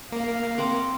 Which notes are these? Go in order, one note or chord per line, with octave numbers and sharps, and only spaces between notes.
A#3 F5
C4 F#5 D6